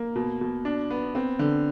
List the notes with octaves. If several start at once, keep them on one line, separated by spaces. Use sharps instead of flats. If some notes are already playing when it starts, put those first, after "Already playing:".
Already playing: A#3
B2
B2
D4
B3
C4
D3